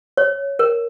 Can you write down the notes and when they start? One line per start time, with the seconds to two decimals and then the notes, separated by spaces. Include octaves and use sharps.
0.17 C#5
0.59 A#4